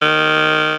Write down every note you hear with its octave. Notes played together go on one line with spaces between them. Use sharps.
D#3